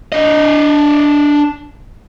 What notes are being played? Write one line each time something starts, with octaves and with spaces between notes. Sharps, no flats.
D4 D#5